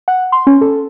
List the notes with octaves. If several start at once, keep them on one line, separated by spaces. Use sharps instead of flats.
F#5
C6
C#4
A4